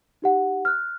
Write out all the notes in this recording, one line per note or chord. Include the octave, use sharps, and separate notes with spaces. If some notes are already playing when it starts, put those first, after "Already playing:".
D#4 G4 F#5
F6 F#6